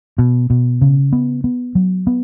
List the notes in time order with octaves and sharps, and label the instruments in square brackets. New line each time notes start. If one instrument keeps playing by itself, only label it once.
[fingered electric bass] B2
B2
C#3
B3
B3
F#3
B3